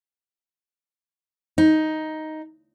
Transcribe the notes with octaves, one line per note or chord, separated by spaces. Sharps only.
D#4